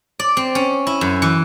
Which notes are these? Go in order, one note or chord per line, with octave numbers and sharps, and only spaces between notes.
D5
C4
C#4
E4
F#2
E3